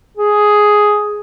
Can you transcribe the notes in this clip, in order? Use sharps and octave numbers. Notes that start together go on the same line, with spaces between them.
G#4